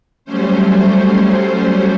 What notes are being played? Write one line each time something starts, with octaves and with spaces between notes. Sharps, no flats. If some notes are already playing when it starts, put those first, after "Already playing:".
F#3 G3 A3 C#4 C5